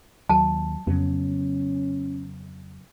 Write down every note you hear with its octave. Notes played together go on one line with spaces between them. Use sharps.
D#2 F#3 A5
F2 C#3 F#3 B3 C#4